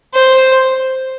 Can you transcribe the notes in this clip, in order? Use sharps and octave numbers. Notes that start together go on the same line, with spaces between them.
C5